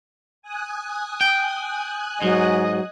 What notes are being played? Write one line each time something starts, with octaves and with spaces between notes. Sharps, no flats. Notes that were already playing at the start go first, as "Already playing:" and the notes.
G#5 D#6 F#6
G5
G#2 F#3 D#5